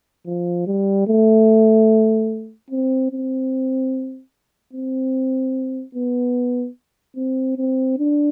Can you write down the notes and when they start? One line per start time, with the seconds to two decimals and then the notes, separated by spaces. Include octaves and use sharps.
0.26 F3
0.67 G3
1.08 A3
2.71 C4
3.11 C4
4.73 C4
5.95 B3
7.17 C4
7.57 C4
7.99 D4